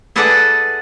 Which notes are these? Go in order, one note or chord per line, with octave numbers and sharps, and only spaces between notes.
E4 G#4 A4 B4 D5 F#5